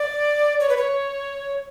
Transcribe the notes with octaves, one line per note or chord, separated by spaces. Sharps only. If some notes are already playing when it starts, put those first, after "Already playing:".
Already playing: D5
C#5
B4
C#5